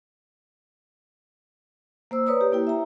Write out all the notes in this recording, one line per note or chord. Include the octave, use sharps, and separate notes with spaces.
A#3 C5 E6
B4 C#5 D5 A#5 D#6
G4
A#3 E4 G5
E5 A#5